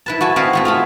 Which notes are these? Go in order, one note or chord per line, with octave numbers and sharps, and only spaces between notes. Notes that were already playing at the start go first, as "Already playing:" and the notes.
E4 B4 A5
F#4 A4 G#5 A5
C4 D#5 F5 F#5 G#5 B5
A3 B3 F#4
F4 G#4 A4